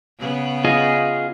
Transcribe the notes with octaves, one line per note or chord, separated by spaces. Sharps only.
C#3 B3
F4 G#4 D#5